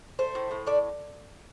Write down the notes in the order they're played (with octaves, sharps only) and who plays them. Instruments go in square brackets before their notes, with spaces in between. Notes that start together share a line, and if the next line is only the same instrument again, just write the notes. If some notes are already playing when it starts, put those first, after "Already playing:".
[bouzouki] A3 C5
A2
A2
A3 D5